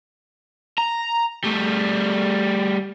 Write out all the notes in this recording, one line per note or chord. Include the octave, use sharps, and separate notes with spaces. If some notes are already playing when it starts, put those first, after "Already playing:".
A#5
G3 A3